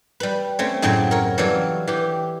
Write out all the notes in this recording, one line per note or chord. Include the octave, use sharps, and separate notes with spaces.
G3 B4
A3 C4 C#4 C#5
F#2 A2 C#3 F#3 C4 C#5
A#4 C#5
E3 F#3 G3 A4 C#5 F5
E3 G4